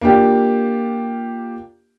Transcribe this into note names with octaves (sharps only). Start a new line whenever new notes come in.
A#3 D4 F4 G4